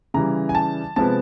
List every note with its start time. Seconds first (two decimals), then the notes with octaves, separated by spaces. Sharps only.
0.14 C#3 E3 G3 A#5
0.49 G#5
0.55 A5
0.96 C3 F3 G#3 B3 A5